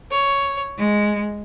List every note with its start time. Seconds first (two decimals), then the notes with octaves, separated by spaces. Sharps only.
0.11 C#5
0.78 G#3